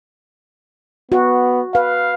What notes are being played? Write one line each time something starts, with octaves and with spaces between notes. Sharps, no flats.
B3 F#4
B4 F5